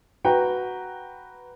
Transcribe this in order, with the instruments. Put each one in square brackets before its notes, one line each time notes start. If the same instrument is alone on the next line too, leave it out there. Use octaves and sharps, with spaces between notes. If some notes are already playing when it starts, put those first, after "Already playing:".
[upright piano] F#4 B4 G5 A#5